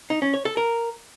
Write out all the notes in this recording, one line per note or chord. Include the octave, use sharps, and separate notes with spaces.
D#4
C#4
C#5
A4
A#4